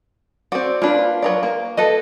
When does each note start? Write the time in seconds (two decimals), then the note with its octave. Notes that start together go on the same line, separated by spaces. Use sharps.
0.52 C4 F#4 D5
0.82 A#3 D4 F4 B4
1.22 F#3 A#4 D5
1.43 A#3
1.77 A4 B4 D#5